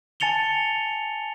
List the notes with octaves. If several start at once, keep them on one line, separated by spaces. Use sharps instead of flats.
G#5 A5 A6 C#7 F7 G7